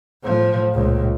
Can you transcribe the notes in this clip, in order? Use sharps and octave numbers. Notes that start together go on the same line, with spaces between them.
A2 F3
C#2 A#2